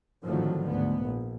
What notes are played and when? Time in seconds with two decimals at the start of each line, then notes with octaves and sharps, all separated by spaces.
0.25 G#1 A2 D3 D#3 F3 F#3
0.68 D2 G#2 B3
1.05 A#1